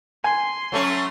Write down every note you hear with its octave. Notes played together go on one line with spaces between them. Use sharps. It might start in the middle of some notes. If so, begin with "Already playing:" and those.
G#5 C6
F#3 A3 C#4